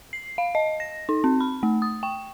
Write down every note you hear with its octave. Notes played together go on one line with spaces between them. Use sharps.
C7
F5
D#5
A#6
D#4
C4
B5
A3
D#6
G5